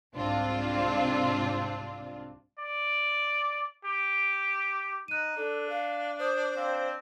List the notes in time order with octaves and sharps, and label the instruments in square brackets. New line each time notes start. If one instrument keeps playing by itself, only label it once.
[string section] C2 G#2 C4 D4 F4
[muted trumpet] D5
G4
[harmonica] D#4 [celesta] F#6 D#7
[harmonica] D4 [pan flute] A4
[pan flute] F5
[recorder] C5 [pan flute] D#6
[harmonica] C4 D4 [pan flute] F5